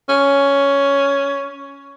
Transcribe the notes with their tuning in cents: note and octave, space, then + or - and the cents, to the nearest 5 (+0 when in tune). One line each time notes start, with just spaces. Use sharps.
C#4 +10